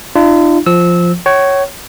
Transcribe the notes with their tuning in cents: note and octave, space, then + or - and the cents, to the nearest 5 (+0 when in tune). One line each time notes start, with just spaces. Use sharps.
D4 +35 F4 -40
F3 +0 E6 -20
C#5 +0 F#5 +45